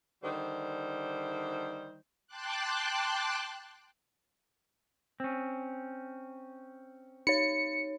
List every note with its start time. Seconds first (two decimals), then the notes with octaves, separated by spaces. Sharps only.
0.23 D3 D#3 G3 C5
2.27 G5 A5 C6 D6 F#6
5.20 C4 C#4
7.27 D#4 C#5 C#7